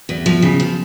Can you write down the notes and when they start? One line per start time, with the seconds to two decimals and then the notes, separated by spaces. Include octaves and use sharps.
0.09 E2
0.26 F3
0.42 C#3
0.60 F3